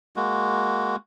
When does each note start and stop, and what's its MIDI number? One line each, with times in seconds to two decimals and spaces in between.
0.16 0.96 56
0.16 0.96 58
0.16 0.96 66